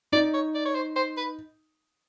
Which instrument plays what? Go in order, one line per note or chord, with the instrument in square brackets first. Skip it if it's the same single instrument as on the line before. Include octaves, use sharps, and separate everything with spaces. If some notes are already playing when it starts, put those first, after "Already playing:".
[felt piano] D#4 [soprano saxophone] D5
[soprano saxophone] C#5
D5
C#5
C5
C5
B4